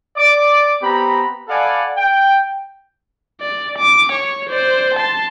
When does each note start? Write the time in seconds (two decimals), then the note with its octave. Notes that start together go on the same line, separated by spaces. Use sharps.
0.17 D5 D6
0.82 B3 C4 G4 A#5 B5
1.48 A4 D5 F5 F#5 G#5 B5
1.96 G5
3.40 D5
3.78 D6
4.12 C#5
4.49 C5 D5
4.95 A5 C6